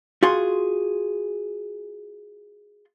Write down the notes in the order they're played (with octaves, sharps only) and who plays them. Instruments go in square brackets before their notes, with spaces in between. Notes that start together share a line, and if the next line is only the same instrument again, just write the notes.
[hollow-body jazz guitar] F4 F#4 G#4 C6